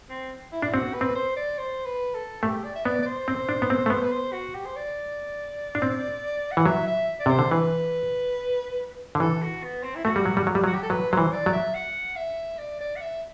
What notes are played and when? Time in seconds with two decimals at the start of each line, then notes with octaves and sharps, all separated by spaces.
0.09 C4
0.52 E4
0.62 D4 E4
0.72 C4 F#4
0.94 B4
1.01 C4
1.15 C5
1.36 D5
1.58 C5
1.85 B4
2.14 A4
2.42 A3 G4
2.64 D5
2.75 E5
2.85 B3 D5
3.02 D5
3.06 C5
3.28 C4
3.49 D4
3.62 B3
3.70 C4
3.86 A3
3.90 B3
4.03 B4
4.12 C5
4.33 F#4
4.54 G4
4.65 C5
4.76 D5
5.75 D4
5.82 C4
6.52 F#5
6.57 E3
6.66 F#3 E5
6.87 E5
7.20 D5
7.26 C3 C5
7.39 D3
7.51 E3 B4
9.15 D3
9.20 E3 A4
9.42 F#4
9.63 B3
9.83 C4
9.95 E4
10.05 A3 F#4
10.16 G3
10.25 F#3
10.37 G3
10.47 F#3
10.55 G3
10.64 F#3
10.67 F#4
10.74 G4
10.82 A4
10.90 F#3 B4
11.11 F#3 C5
11.17 E3
11.32 D5
11.46 F#3
11.53 E5
11.74 F#5
12.16 E5
12.59 D5
12.81 D5
12.96 F#5
13.01 E5